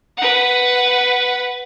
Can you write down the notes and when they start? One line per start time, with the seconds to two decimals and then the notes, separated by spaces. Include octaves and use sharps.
0.17 B4 F#5